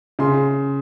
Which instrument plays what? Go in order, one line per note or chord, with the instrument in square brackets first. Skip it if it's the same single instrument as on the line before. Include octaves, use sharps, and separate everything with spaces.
[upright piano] C#3 C6